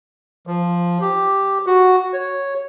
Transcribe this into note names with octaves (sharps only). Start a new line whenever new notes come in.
F3
G4
F#4
C#5